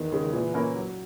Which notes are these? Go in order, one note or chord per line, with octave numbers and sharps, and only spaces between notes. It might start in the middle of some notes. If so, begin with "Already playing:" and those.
Already playing: E2 D#3
C#3 G#3
A#2 E3
A#3 C#4 E4 A#4
F#3